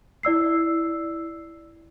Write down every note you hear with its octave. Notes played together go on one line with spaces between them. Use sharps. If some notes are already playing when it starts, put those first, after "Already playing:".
E4 D5 E6 C7